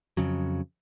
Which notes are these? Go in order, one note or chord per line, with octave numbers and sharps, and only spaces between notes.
F2 C#3 F#3